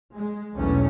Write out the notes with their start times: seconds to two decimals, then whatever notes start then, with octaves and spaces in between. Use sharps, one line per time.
0.15 G#3
0.57 B1 E2 D3 A3 C#4